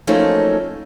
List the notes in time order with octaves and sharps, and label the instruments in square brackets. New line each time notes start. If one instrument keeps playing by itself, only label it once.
[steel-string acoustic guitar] F3 F#3 A3 A#3 C#4 D#4